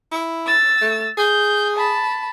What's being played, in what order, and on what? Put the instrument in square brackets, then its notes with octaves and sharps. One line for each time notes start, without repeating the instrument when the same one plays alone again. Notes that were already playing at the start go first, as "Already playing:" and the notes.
[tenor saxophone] E4
[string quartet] E6 A6
[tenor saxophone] A3
[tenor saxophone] G#4 [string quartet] G6
[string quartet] A5 B5